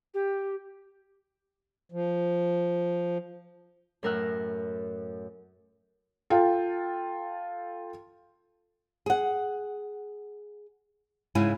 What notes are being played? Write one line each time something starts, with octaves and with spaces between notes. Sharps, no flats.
G4
F3
F#2 A2 A#4 A#5 E6 F#6
F4 A4 G5
G#4 F#5
G#2 C#3 E4 G#5